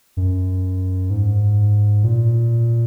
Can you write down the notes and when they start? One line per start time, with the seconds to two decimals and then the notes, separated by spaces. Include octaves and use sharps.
0.17 F#2
1.10 G#2
2.03 A#2